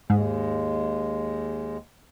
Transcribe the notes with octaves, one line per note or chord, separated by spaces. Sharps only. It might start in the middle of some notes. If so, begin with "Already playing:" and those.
D#2 G#2 G#3